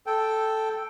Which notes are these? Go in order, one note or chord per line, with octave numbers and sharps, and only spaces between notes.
A4 G5